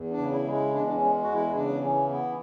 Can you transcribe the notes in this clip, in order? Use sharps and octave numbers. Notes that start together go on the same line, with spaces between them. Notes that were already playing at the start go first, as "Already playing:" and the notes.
Already playing: E2
D4
C#3
E4
G#3
E4
E2 D4
D4
C#4
G#3
E2 F#4
E4
C#3 D4
E3 C#4
B3 E4